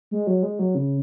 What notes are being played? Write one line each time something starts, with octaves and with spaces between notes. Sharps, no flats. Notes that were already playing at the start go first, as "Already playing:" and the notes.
G#3
F#3
G#3
F#3
C#3